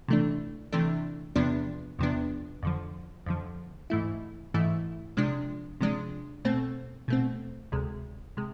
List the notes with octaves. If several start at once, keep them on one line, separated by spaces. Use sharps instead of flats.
C3 E3 A3 D4
C3 E3 A3 D4
E2 C3 F3 B3 D4
E2 C3 F3 B3 D4
F2 D3 F3
F2 D3 F3
G#2 E3 A3 E4
G#2 E3 A3 E4
C3 F3 G#3 D4
C3 F3 G#3 D4
B2 A3 C4
B2 A3 C4
D2 C3 G#3
C3 G#3